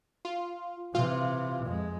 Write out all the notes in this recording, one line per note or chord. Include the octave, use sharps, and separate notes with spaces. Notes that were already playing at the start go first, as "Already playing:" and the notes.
F4
C3 E3 F4
F2 G#3